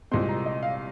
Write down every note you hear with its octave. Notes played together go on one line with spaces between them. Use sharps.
C2 A#2 G#3 C4 C6
A#5
D#5
F5